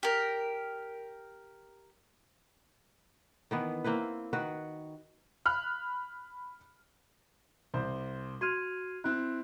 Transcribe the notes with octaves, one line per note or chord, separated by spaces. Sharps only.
G4 A#4
D#3 E3 B3
A#3 C4 E4 B4
D#3 F#4 B4 F#5
B5 F6 F#6
C2 C4 C5
F#4 C6 F6 G#6 D#7
C4 E4 F#6